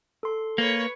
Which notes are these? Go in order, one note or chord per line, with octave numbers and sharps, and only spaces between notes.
A4 C6
A#3 B4 C#5